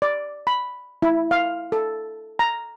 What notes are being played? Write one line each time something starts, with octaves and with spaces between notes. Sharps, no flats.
D5
B5
E4
F5
A4
A#5